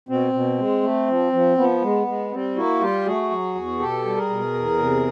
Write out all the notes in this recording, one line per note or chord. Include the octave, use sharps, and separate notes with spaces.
B2 C4
B2
G#3
A3
F3
F3
F3 B3
G#3
G#3
G3 C4
A#3 E4 F#4
G3 F4 G4
A3 F#4 G#4
F#3
E2
B2 G4 A4
G3
G#4 A#4
B2
E2
C3